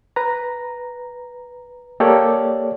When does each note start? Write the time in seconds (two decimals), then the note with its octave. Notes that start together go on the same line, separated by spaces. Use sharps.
0.16 B4 A#5
2.00 A#3 G4 A4 C#5 D5